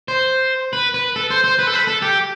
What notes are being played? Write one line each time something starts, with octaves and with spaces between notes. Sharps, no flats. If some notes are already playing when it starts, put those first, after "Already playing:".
C5
B4
B4
A4
C5
C5
B4
A4
B4
A4
G4